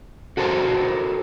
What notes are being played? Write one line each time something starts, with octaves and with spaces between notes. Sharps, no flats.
F#4 A4 A#4 C5 A5